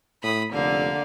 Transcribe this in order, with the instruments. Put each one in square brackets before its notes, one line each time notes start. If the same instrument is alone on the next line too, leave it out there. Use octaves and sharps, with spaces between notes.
[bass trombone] A2 [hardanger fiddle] B5 D#6
[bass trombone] F1 [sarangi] D3 [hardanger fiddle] A#3 F5